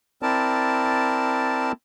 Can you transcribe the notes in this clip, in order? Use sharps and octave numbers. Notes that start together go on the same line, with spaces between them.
C4 E4 A#4 D5 A5